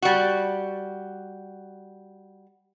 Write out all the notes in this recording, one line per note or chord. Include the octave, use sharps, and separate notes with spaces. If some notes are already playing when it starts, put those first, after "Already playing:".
G3 F#4